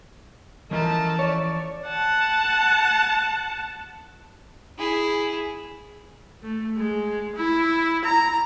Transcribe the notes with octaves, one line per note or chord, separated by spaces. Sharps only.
E3 F3 A3 C#4 A#4 D#5 A5
C#5 D5
F#5 A5
E4 G#4
A3
G#3
E4
A#5